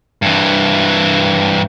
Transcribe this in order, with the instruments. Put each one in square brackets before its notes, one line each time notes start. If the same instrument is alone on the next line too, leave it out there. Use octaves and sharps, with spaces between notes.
[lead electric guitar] G2 E3